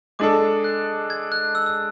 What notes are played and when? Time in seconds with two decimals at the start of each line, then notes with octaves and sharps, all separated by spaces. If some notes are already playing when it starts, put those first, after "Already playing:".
0.19 G#3 D4 A4 D6
0.64 F#6
1.10 G#6
1.32 F#6
1.55 E6
1.66 E6